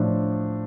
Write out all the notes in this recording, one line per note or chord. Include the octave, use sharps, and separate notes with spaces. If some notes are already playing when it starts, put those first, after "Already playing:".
Already playing: A2 F3 D4